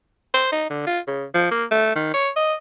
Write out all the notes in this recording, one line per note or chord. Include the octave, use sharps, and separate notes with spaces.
C5
D#4
D3
F4
C#3
F3
A#3
A3
D#3
C#5
D#5